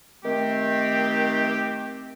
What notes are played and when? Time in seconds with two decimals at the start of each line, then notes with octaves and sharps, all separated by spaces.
0.24 D#3 A3 C4 G4